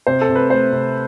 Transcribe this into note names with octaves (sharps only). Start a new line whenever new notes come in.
C3 C5
A4
C3
B4
A3 C5
C3